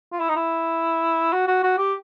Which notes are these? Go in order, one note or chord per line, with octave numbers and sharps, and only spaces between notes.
F4
E4
D#4
E4
F#4
F#4
F#4
G4